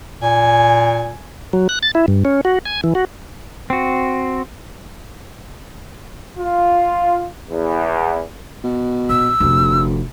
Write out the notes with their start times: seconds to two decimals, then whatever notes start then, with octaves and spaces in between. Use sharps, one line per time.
0.22 A#2 G#5
1.53 F#3
1.69 F#6
1.83 A6
1.95 E4
2.08 G2
2.25 C#4
2.45 F#4
2.66 G#5
2.84 E3
2.95 F#4
3.70 C4 F#4
6.39 F4
7.50 E2
8.63 B2
9.09 A#1 E6
9.40 F1 D2 F3